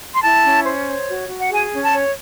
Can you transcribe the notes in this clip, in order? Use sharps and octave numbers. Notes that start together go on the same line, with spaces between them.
C6
E4 A5
C#4
C5
C#5
F#4
F#4
F#5
G#4 G#5
C#4
A5
C#5